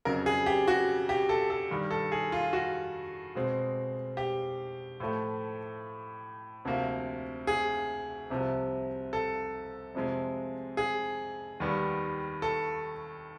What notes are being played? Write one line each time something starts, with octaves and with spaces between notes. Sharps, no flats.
F2 C#3 F#3 A#4
G#4
G4
F#4
G4
A4
A4
G2 D#3 G3
A4
G#4
F4
F#4
B2 G#3 C4
G4
A2 F3 A3
D2 C3 F3 A#3
G#4
C2 C3 F3
A4
F2 C3 F3 G#3
G#4
D#2 D#3 G3 B3
A4